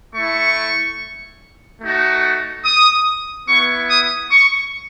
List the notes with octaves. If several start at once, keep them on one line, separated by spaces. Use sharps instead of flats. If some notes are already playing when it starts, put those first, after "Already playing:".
A3 E4 C#6
A3 D#4 F#4
D#6
B3 E4 C#6
D#6
C#6